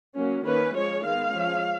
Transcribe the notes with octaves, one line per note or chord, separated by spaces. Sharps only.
F#3 A#3 C#4
D#3 A#3 C#4 B4
F3 G#3 C#4 C#5
D#3 G#3 B3 F5
F3 G#3 C#4